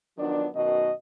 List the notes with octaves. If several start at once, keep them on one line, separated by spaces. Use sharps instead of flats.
D#3 F3 F#3 B3 D4
F#2 B2 D#3 D#5